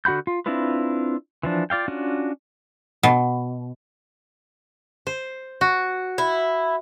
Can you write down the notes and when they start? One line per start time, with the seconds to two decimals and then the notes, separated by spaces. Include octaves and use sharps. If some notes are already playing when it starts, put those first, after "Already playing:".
0.05 D3 F#4 F#5 B5 G6
0.27 F4
0.46 C4 D4 E4 F4 B4
1.43 E3 F3 D4
1.70 F4 D5 F5 G5
1.88 C#4 D4 F4 F#4
3.03 B2
5.07 C5
5.61 F#4
6.18 E4